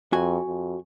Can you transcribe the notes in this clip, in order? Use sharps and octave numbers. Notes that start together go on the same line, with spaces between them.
F2 F#4 G#5
F2